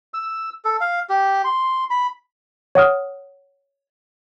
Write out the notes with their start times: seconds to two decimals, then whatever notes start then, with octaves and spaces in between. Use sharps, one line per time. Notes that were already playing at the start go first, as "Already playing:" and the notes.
0.14 E6
0.65 A4
0.81 F5
1.09 G4
1.44 C6
1.90 B5
2.75 C#5 F#5 D#6 F6